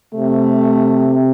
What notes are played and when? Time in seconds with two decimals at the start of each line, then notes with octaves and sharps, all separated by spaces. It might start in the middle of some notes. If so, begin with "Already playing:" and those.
0.14 C3 A3